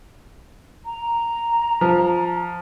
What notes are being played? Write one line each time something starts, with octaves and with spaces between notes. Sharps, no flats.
A#5
F3